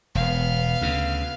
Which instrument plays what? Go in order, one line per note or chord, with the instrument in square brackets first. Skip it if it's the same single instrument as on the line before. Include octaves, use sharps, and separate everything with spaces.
[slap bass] E1 [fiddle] B3 F5
[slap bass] D2 C#3